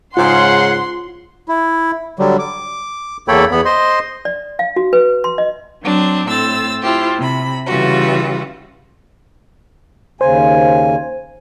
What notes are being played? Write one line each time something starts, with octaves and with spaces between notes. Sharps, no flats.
G#2 C#3 F4 F#5 C6
E4
D3 F#3 G3
D6
E2 A#3 A4 C#5 G5 B5
E2 B3 B5
C5 D#5 C6
D5
F5
F#4
B4
C6
D#5
F#3 C4 D4
A2 C4 E6 A6
E4 F4 G4 C5
C3 B5
C#3 E3 G3 F4 F#4
D#2 C#3 C5 G#5